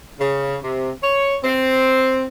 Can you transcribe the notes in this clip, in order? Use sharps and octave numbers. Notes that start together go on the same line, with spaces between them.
C#3
C3
C#5
C4